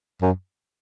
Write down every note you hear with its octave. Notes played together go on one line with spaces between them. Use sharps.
F#2